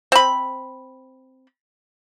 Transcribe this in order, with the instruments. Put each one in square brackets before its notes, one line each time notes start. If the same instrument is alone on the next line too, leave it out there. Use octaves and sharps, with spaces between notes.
[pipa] C4 B5